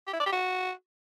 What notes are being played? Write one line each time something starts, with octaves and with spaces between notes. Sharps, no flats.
G4
E4
D5
G4
F#4